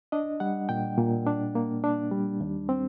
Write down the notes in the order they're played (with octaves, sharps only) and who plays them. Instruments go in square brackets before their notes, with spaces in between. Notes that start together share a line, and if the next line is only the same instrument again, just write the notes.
[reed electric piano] D4 D#5
G3 F#5
A#2 G5
A#2
D4
A#3
D4
G3
D#2
C4